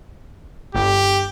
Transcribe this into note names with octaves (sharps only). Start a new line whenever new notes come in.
G1 G4